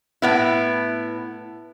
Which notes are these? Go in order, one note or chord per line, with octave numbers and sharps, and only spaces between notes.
A2 B3 E4